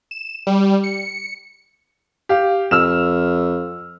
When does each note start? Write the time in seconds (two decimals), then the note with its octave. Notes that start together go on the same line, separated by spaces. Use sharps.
0.11 E7
0.47 G3
0.83 C#7
2.29 G4 F5
2.71 F2 E6 F6 E7